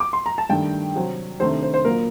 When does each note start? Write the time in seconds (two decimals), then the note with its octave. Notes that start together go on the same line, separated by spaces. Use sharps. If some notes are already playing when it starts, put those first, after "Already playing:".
0.00 D6
0.13 C6
0.26 A#5
0.38 A5
0.49 G2 D#3 A3 D4 G5
0.95 C3 F#3 C4
1.40 C3 D#3 A3 D4 C5
1.63 C5
1.74 C5
1.85 A#2 F#3 A#3 A#4